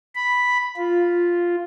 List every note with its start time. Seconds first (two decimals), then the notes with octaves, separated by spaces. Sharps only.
0.15 B5
0.77 F4